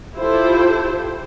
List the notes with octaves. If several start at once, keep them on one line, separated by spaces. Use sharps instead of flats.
E4 F4 G4 A4 C5